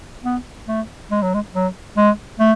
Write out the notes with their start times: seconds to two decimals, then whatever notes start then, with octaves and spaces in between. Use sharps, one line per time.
0.24 B3
0.68 A3
1.11 G#3
1.22 F#3
1.34 G#3
1.54 F#3
1.97 G#3
2.40 A3